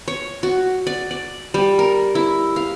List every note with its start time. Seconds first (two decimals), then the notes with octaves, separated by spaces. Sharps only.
0.08 C#5
0.43 F#4
0.87 D5
1.11 D5
1.54 G3
1.79 A#4
2.15 E4
2.56 F5